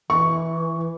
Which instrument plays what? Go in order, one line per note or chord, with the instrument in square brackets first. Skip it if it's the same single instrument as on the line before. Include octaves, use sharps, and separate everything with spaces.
[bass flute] E3 [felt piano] C#6